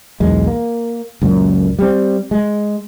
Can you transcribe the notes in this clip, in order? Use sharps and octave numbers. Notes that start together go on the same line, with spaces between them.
B1 E2 G#3
A#3
C#2 F#2 A#2
G3 C4
G#3